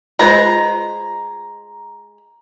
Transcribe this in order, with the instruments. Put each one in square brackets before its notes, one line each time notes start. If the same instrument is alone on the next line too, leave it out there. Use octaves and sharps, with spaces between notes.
[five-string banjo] G#3 B4 C5 [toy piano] F4 D#5 B5 [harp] A#5